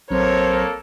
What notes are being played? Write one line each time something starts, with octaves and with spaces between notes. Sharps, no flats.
A#1 F#3 A#3 C4 A4 A#4 C5 C#5